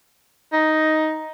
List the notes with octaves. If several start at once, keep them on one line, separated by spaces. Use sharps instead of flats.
D#4